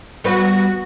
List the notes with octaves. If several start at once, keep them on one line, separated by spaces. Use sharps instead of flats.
G3 B3 F#4 B4